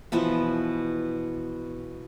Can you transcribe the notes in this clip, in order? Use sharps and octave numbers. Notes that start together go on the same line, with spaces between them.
B2 E3 F3 B3